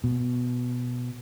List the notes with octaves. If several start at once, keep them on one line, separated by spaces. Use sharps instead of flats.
B2